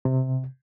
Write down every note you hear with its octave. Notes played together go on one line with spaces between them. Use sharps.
C3